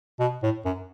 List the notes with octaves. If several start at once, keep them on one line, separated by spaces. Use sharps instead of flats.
B2
A2
F#2